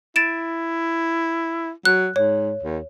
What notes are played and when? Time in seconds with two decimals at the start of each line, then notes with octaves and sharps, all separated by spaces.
0.16 E4 A6 D7 E7
1.85 F#3 F#6
2.16 G#2 C#5
2.62 D#2